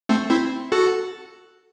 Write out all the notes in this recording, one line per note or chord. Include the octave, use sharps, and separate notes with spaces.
A3 C4
C4 E4
F#4 A4